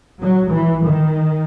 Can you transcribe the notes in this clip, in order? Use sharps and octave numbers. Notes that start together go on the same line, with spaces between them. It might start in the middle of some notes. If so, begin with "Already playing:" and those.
F#3
E3
D#3